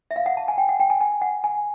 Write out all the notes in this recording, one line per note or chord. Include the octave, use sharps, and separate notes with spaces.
E5
F5
F#5
A5
G#5
G5
F#5
G5
G#5
G#5
F#5
G#5